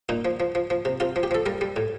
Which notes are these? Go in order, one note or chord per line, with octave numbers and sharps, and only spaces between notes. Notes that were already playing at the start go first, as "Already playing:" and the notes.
A#2 D#4
F3
F3
F3
F3
C3
C3 F4
F3
G4
F3 A4
G3 A#4
G3
A2